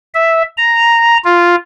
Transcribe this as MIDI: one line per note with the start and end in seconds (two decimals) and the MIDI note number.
0.14 0.42 76
0.57 1.17 82
1.25 1.55 65